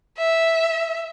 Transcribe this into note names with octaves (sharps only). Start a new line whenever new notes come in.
E5